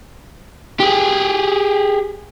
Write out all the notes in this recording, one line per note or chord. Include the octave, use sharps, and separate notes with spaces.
G4 G#4